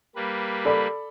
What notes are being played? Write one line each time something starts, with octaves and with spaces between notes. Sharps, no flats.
G3 A#3 B4
A4 D5 B5